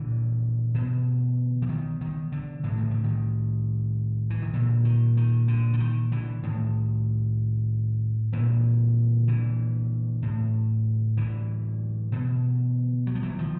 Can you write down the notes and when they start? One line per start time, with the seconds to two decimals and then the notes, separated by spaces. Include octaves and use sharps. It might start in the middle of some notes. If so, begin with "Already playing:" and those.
Already playing: A#2 D3 E3
0.74 B2
1.62 E3
1.69 D#3
2.01 D#3
2.32 D3
2.64 A2 E3
2.77 D#3
2.91 D3
3.04 D#3
4.30 E3
4.42 D#3
4.53 A#2 D3
4.85 D#3
5.17 D#3
5.48 D3
5.73 D3
5.80 D#3
6.12 D3 E3
6.43 A2 D#3
8.32 A#2 D3 E3
9.28 D3 E3
10.22 A2
11.17 D3 E3
12.12 B2
13.07 F#3
13.15 F3
13.23 E3 F#3
13.39 D#3 F3